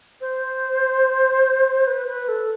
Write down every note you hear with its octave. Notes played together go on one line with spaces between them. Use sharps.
C5
B4
B4
A4